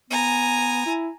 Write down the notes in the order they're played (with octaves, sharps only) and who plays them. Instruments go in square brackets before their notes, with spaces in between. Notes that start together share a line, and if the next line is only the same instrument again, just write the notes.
[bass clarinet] B3 [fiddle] G#5 A#5
[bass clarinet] E4